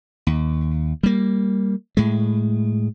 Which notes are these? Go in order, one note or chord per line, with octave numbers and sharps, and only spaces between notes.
D#2
G3 A#3
A2 G#3